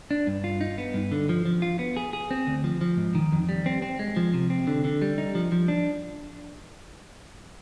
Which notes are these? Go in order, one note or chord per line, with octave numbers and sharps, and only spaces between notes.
D4
G2
F4
D#4
B3
G2
D3
F3
F3
F4
B3
G#4
G#4
C4
D2
F3
F3
G#2
D#3
F2
G3
C4
C4
G#3
F3
C3
C4
D3
D3
G3
D#4
F3
F3
D4